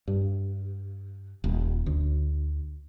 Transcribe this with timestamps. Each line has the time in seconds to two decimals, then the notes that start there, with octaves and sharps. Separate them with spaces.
0.08 G2
1.44 D#1
1.86 D2